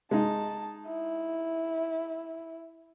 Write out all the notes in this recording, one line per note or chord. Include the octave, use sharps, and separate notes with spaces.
G#3 D#4 A5
E4